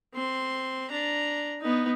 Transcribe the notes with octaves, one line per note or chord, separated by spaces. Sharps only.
C4 C6
D4 A#5
B3 D#4